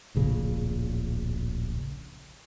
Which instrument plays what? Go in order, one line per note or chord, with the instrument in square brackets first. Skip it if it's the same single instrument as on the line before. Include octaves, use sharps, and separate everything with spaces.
[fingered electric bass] D1 A#1 C#3 A#3